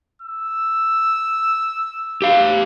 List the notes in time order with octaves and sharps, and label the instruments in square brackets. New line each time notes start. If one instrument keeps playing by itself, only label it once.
[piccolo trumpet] E6
[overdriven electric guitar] G4 F5